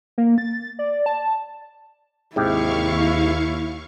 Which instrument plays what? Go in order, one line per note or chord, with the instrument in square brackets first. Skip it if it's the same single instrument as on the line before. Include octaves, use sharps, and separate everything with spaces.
[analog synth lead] A#3
A6
D5
A5
[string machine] D#2 F5 C#6 [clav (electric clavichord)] G#2 C3 G4 [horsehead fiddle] E4